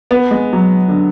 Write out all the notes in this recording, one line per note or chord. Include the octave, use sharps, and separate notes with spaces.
B3
G#3
F#3
D3